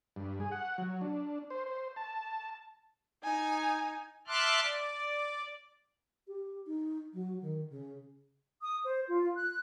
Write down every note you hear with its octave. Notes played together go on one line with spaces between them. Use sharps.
G2
G#4
F#5
F#3
D4
C5
C5
A5
D#4 G#5
E5 A5 C6 D6 F6 F#6
D5
G4
D#4
F#3
D#3
C#3
D#6
C5
F4
F#6